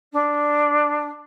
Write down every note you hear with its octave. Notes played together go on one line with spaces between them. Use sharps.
D4